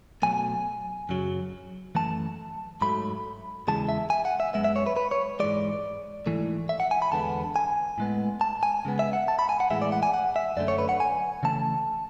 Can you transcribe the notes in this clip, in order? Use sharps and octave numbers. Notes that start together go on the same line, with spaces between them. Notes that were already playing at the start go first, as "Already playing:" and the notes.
B2 F#3 A3 G#5
F#2 C#3 F#3
F#2 E3 A3 A5
G#2 F#3 A3 B5
E2 C#3 E3 G#3 A5
E5
G#5
F#5
E5
F#2 C#3 G#3 B3 E5
E5
C#5
B4
B4
C#5
G#2 E3 G#3 D5
G#2 E3 A3
E5
F#5
G#5
B5
E2 D3 G#3 B3 A5
G#5
A2 G#3 B3
A5
G#5
C#3 G#3 B3
E5
F#5
A5
B5
G#5
F#5
A2 E3 G#3 B3 E5
D5
F#5
G#5
F#5
E5
F#2 D3 A3 D5
C#5
B4
F#5
G#5
C#3 E3 A3 A5